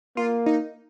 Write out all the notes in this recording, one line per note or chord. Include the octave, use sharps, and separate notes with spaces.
A#3 F4
D#4